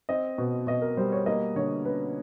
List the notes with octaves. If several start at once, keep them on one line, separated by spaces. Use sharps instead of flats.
C4 D#5
B2
B2 D#5
A#4
G3 C5
C#5
A#3 D#5
D3 C#5
C#4 B4